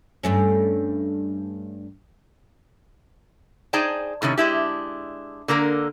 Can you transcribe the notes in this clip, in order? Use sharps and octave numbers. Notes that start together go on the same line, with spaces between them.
G2 A3 C#4
D#4 G#4 C5 D5 G5 A5
A2 C3 D#3 C#4
G#3 D4 E4 G4
D3 A#3 A#4 A#5